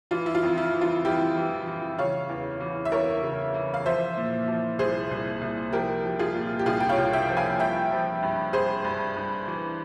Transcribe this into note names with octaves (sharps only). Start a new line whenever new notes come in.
E3 F4
E4
F4
F2
E4
E3
F4
E3 E4 G4
E3
E3
C#3 C#5 F5
E2
E3
E5
E2 A#4 C#5
C#3
E3
F5
F3 C5 E5
A#2
F3
C2 G#4 C5
C2
C2
F3 G4 A#4
F3
F4 G#4
A#2
G4
C2 F4 G#4
G5
C#5 F5
C2
E5 G5
F3
F5 G#5
G2 E5 G5
F3
G2
G2 G#4 C5
G2
G2
E3